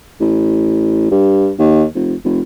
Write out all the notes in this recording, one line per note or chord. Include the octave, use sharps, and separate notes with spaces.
A1
G2
D#2
F1
F1